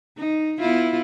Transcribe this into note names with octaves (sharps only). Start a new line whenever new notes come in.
D#4
B3 E4 F4